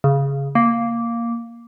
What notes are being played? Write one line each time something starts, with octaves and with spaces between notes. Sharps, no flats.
C#3
A#3